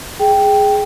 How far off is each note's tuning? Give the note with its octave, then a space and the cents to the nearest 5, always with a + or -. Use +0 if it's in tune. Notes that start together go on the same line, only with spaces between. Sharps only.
G#4 +0 G5 +0